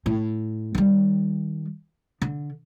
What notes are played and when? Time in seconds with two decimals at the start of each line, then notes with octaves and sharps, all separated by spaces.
0.06 A2
0.75 D#3 G3
2.22 D3